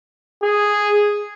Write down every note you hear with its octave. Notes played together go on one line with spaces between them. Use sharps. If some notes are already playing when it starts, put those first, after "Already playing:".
G#4